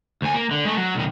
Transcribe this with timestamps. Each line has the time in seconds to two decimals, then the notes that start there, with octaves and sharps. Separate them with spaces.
0.22 D2 G#5
0.34 A#3
0.51 D3
0.65 G#3 A3
0.77 F#3
0.95 B1 D#3